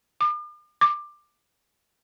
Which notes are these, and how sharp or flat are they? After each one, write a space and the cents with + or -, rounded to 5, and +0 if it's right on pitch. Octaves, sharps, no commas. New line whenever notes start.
D6 +45
D6 +20